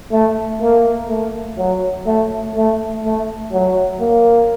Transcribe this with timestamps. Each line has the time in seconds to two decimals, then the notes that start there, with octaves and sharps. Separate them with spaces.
0.11 A3
0.61 A#3
1.09 A3
1.58 F#3
2.06 A3
2.56 A3
3.04 A3
3.52 F#3
4.01 A#3